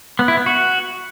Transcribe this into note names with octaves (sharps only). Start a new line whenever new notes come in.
B3
E4
B3
F#4